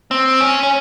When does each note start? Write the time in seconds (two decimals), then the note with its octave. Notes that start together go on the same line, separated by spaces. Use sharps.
0.11 C4
0.40 C#4
0.63 C#4